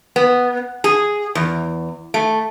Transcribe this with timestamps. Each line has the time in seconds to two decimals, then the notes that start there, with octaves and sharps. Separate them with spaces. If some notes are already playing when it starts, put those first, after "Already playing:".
0.16 B3
0.84 G#4
1.35 E2
2.14 A3